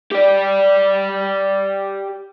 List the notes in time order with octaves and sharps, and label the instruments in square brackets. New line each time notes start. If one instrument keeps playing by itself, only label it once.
[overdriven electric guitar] G4 D5